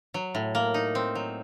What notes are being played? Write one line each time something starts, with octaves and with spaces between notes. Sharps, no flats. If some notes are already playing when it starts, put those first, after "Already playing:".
F#3
A2
A#3
D#4
C4
F#3